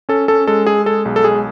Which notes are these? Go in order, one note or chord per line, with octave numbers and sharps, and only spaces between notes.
C#4 A4
C#4 A4
G#3 A4
G#3 G#4
G#3 A4
B1
A4
G#3 G#4